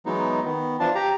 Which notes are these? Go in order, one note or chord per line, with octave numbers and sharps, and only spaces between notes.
E3 F#3 G#3 B3 D#4
D#3 B3
E3 F3 D4 F4 A5
G4 A#5